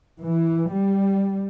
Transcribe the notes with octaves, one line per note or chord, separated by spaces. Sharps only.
E3
G3